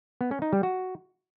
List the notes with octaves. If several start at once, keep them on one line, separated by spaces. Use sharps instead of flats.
B3
C#4
D#4
G3
F#4